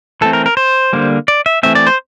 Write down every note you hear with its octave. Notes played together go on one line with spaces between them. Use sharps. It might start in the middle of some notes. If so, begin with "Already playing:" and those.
E3 A3 C4 A4
A#4
A#4
C5
D3 G3 A#3
D5
E5
E3 A3 C4 E5
D5
C5